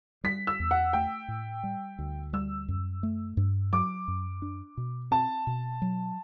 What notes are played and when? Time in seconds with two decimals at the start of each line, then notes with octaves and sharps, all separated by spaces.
0.24 G3 B6
0.47 E6
0.60 E2
0.71 F#5
0.93 A3 G5
1.28 A2
1.63 G3
1.99 D2
2.33 G3 E6
2.68 F#2
3.03 A3
3.37 G2
3.73 F#3 D6
4.08 F#2
4.42 D4
4.77 B2
5.11 C4 A5
5.47 B2
5.82 F#3